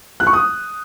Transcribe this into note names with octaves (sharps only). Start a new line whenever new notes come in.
F#6
C#6
D#6